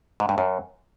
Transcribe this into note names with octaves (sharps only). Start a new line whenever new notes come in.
G#2
G2
F#2